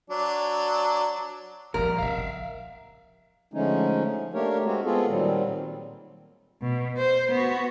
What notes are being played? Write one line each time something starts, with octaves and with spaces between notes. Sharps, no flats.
F#3 D4
A#2 F3 G3 C4 A#4
A#1 C#3 E5 F5
F3
D3 F3 G#3 A3 C#4 D#4
A3 A#3 D4 G4 A#4 C#5
G#3 C4 F#4
G#3 B3 C4 F4 G#4 A4
A#2 D#3 F#3 G3 C4
B2
C5
B3 F#4